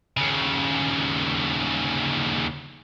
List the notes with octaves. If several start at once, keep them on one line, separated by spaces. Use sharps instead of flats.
D#2 C#3